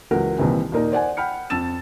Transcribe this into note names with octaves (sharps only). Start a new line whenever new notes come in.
C#2 E3 F#3 A#4 F#5
C2 A#2 D#3 E3 C4
D#2 A#2 A#3 D#4 A#4 D5
C5 D5 F#5 G#5
F#5 G5 B5 F6 C#7
F2 A5 E6 A6 E7